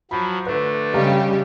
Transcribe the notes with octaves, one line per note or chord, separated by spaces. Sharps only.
F3 F#3 B5
D3 A3 B4
C#3 G3 G4 D#5 F5 A#5